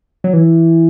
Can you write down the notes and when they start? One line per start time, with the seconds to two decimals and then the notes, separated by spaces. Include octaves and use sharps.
0.24 F#3
0.33 E3